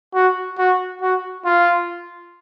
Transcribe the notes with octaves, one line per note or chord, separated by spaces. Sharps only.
F#4
F#4
F#4
F4